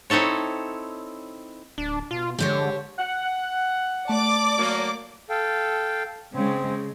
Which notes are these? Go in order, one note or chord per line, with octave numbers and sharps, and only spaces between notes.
C4 D#4 E4 A4 C#5
D1 D4
B2 F4
D3 G#3 G4 C5 C#5
F#5
A3 D5 A5 D6
F#3 A#3
A4 F5 G5
C#3 G#3 C4